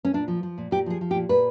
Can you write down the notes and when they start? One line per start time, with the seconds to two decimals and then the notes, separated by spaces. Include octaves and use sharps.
0.05 C#4
0.14 A#2 D4
0.28 F3
0.43 F3
0.58 A#2
0.71 A#2 G4
0.86 F3 G#4
1.01 F3
1.11 G4
1.15 A#2
1.29 A#2 B4